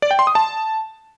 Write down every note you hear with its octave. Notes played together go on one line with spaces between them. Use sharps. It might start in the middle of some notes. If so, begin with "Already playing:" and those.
D5
G5
C6
D#6
A5